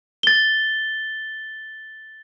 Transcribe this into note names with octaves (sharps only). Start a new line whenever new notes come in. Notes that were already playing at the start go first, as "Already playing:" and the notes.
A6 G7